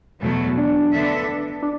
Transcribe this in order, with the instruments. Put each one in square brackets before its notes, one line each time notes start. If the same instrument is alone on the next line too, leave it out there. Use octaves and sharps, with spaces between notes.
[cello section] E2 B2 F#3 A3
[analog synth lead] D4
[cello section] D3 B3 D4 A4 E5
[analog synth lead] D4